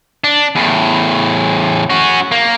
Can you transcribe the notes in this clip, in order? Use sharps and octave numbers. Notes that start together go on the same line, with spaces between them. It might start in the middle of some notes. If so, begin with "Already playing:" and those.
D4
E2 A2
C#4 F#4
A#3